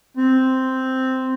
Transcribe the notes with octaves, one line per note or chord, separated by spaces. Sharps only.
C4